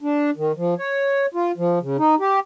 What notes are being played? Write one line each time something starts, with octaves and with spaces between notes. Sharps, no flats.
D4
D#3
F3
C#5
F4
F3
C#3
D#4
G4